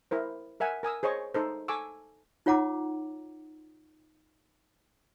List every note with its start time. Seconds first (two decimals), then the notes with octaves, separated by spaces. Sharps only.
0.11 E4 A#4 C5
0.60 A#4 E5 F#5 G#5
0.83 A#4 G#5 D#6 E6
1.03 G#4 C5 C#5 D#5 C#6
1.34 D#4 A4 C5
1.68 A4 G#5 C#6 D6 E6
2.46 D#4 F4 C#5 F#5 A#5 D6